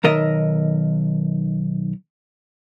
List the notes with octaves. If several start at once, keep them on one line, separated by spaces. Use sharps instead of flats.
B1 D#3 A#4 D#5 E5